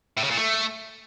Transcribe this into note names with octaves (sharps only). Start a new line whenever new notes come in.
A2
C#3
A#2
A3